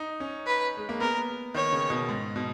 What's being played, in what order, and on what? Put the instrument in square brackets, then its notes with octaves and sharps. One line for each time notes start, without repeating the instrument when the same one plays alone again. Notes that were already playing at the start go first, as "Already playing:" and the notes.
Already playing: [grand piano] D#4
C#4
[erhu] B4
[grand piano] G#3
A#3
[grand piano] B3 [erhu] A#4
[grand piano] D#3 [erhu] C#5
[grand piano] C#3
B2
G#2
B2